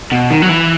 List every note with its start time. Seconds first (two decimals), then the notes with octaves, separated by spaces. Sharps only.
0.12 B2
0.30 D#3
0.42 F#3
0.49 E3